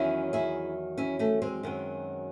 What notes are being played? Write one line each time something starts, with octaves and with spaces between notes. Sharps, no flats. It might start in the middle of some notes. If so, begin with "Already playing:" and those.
Already playing: E2 D#3 F#3 C#4 E4
E4 G#4
C#4 E4
A3 C#4
G#3 C4
F#2 D#3 F#3